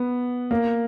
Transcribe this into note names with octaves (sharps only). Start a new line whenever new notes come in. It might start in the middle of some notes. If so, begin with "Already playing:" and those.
Already playing: B3
A#3